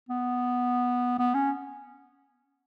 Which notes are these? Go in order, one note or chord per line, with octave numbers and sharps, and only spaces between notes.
B3
B3
C#4